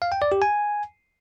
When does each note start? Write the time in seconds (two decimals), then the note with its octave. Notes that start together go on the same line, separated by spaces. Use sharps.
0.02 F5
0.12 G5
0.22 D5
0.32 G4
0.42 G#5